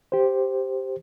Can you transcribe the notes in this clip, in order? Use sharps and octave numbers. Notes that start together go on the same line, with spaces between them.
G4 C5